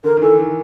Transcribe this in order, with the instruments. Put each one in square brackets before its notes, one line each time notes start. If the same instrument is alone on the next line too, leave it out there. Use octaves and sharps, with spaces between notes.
[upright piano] D3 [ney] A#4
[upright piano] D#3
[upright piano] E3 [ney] A4
[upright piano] D#3